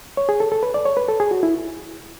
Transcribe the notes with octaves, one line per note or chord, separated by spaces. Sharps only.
C#5
G#4
A4
A4
B4
D5
C#5
B4
A4
G#4
F#4
E4